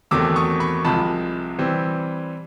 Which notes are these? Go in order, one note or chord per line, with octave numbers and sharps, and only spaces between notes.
E2 C3 D#3 F#3 A3 D6 E6
C#6 D#6
B5 C#6
C2 C3 F3 G#3 A5 B5
E3 G3 C4